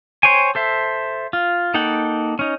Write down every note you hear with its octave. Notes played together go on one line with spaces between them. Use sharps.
C5 C#5 G5 G#5
A4 C5 E5
F4
A#3 D#4 A4 F#5 G5
C#4 D#4